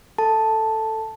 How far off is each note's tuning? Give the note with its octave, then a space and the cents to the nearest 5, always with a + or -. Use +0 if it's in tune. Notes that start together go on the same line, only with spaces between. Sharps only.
A4 +10 A5 +0